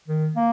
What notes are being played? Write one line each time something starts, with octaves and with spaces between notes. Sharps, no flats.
D#3
A#3